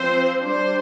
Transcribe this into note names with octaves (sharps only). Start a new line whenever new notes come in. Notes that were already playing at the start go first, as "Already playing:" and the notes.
Already playing: F3 C4 C5
G3 D4 C5